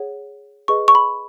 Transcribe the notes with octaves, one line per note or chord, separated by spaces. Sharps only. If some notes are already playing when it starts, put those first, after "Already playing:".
Already playing: G#4 C#5 F#5
G#4 B4 D#5 C#6
C#6
B5